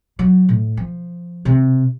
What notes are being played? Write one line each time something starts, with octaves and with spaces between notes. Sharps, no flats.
F#3
A2
F3
C3